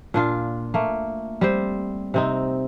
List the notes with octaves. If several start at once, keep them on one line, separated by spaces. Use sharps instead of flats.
A#2 D4 F4
A3 A#3
G3 C4 C5
C3 C4 D#4